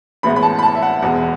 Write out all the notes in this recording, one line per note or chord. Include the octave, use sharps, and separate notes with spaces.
A1 A2 G#3 B3 B5
B5
A5
B5
A5
E5
F#5
E1 E2 B2 G#3 F#5